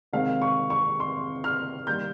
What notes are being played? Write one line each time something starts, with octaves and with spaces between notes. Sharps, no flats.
C3 D#3 G#3 C4 F5
C#6
C#6
C6
F6
D#3 G3 A#3 G6